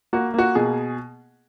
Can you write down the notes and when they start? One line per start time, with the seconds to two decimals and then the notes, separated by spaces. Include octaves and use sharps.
0.13 A#3 F#4
0.34 A#3 F#4
0.55 B2 G#4